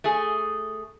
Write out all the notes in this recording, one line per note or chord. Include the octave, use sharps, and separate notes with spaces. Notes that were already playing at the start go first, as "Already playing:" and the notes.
A3 G#4